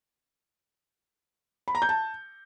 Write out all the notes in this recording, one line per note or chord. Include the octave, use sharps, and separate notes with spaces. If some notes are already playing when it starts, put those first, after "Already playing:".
B5
A#5
G6
A5